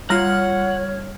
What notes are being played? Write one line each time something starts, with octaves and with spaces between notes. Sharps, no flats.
G3 F4 C#5 F#5 A#5 F6